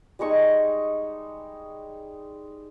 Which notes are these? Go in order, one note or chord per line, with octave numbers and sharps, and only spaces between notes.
G3 G#3 D#4 C#6